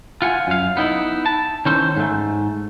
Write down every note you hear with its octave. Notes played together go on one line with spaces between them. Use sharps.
F4 F#5 G#5
F#2 F5
B3 D#4 E4
A5
D#3 E3 C#4 A4 C5
G#2 A3